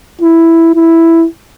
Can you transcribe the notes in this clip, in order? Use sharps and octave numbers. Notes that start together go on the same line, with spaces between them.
E4
E4